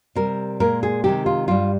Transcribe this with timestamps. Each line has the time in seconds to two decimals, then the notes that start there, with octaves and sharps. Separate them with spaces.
0.15 C3 G3 A#4
0.60 A#2 G#3 A#4
0.83 G#4
1.04 C3 D#3 G#3 G4
1.26 F4
1.48 G2 G3 F4